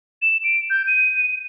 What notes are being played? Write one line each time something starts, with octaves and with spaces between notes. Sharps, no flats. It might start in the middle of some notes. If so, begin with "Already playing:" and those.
E7
D7
G6
D#7